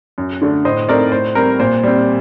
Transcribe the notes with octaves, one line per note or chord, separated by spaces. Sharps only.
F#2
D3 A3 D4
A2 C5 D#5
A3 C4 D#4 A#4 D5
A2 C5
G3 C4 A#4
A#2 C5
G3 C4